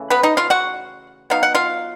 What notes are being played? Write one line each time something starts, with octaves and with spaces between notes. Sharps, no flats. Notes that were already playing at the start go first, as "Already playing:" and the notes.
Already playing: C#3 E3 A3
B3 B4
D#4 D#5
F4 F5
F#4 F#5
F#3 B3 D#4 F5
F#5
F4 F5